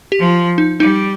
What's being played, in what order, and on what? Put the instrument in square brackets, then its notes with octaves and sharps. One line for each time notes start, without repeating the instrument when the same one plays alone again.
[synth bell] G4
[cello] F3
[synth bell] D#4
[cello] G3 [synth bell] D#4